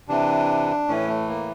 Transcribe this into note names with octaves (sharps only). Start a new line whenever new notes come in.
C3 E3 D4
A2 E3 C#4
A3
A#3